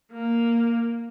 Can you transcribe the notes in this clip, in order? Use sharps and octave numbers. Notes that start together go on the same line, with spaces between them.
A#3